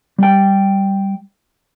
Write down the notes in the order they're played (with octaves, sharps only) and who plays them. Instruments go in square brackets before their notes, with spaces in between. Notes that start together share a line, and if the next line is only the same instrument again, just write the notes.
[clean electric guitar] G3 G5